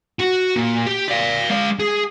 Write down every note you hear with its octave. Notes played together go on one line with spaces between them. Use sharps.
F#4
A#2
G4
D5 F5
G#3 F5
G#4